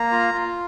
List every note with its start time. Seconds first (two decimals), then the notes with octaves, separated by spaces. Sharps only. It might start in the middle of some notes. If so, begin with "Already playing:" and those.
Already playing: A#3 A#5
0.12 F4
0.34 F4